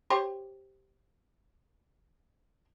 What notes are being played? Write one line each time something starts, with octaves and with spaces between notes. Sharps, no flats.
G4 C5 C#5